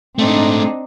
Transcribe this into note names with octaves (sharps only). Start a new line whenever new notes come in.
G#2 A3 C4 D4 D#4